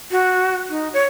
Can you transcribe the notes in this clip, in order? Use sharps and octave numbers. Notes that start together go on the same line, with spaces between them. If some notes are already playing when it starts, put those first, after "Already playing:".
F#4
D#4
C#5